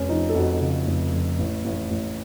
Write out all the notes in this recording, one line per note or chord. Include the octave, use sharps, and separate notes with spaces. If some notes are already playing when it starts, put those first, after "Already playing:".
Already playing: F1 C#4
F3 D#4
A4
F2 F#4
C#3
F1
F2
A1
A1
A1